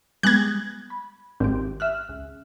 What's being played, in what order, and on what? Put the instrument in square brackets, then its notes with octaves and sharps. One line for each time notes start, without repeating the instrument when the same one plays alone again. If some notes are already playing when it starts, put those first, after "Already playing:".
[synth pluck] G3 G#3 B3 [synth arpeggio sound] F#6 G#6
[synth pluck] B5
[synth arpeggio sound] G#1 [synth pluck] C4 G4
[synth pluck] E5 F6 F#6
C#2